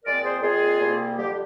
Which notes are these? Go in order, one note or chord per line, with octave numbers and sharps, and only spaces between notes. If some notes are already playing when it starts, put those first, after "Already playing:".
A#2 G#3 C4 A#4 D5
G#4 C5
A#2 G#3 C4 F4 G#4
C2 C3 G3 A#3
F2 D3 G3 G4